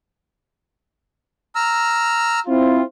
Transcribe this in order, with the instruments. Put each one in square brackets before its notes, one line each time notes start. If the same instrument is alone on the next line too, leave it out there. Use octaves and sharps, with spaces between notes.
[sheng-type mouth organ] A#5 E6 F6
[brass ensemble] C4 E4 F4